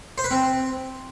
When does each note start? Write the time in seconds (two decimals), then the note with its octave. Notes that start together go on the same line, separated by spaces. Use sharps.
0.18 C5
0.24 B4
0.31 C4